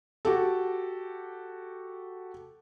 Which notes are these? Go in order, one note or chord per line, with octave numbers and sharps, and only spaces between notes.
F#4 G4 A4